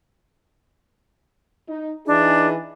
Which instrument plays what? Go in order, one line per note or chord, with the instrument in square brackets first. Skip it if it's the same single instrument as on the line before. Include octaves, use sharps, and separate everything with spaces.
[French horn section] D#4
[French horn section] E3 D#4 G#4 [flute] D4